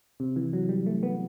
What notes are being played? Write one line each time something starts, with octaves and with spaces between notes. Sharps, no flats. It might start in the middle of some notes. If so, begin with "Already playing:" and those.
C3
E3
F#3
G3
A3
B3